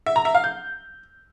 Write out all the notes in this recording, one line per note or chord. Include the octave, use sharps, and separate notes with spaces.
E5
A#5
E5
F5
G6